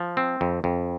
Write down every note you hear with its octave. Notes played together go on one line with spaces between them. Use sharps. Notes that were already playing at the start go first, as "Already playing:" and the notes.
Already playing: F3
C4
F2
F2